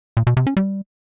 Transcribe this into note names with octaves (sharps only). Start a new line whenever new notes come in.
A#2
B2
C3
C#4
G3